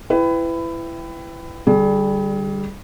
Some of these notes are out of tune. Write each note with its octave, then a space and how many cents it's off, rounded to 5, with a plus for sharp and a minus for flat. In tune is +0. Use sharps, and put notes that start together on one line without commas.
E4 +20 B4 +25 G5 +0
D3 +15 G3 +0 G#4 +35